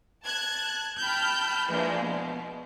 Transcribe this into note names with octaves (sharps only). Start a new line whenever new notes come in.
A5 F#6 G#6
G5 A5 B5 F6 G6
E3 F3 G#3 A#3 D4
B2